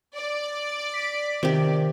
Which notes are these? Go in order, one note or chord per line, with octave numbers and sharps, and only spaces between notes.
D5
B6
C3 D#3 G4